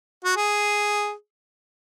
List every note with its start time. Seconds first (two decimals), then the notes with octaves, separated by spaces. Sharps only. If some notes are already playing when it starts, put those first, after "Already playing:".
0.25 F#4
0.37 G#4